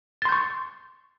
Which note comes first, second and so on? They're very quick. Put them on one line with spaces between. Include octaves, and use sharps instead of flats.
A6 C6 G6 C#6